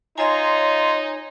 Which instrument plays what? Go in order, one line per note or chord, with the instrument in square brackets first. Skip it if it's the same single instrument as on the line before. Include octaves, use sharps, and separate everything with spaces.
[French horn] D#4 [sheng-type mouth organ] F4 A#5 C6 [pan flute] C#5 [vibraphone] D#5 G#5